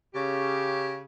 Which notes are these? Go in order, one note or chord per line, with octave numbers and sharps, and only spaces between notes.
C#3 G4